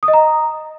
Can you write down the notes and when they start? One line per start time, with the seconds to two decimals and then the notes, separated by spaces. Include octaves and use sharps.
0.03 D#6
0.08 D#5
0.13 A#5